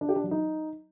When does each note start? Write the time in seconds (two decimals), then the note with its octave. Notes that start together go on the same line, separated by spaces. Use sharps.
0.01 D4
0.09 G4
0.16 D4
0.24 F#3
0.31 D#4